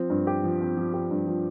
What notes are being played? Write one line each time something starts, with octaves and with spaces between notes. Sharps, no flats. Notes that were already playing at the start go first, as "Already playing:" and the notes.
Already playing: F3 C4
G2
G4
F3
C4
F3
G4
G2
F3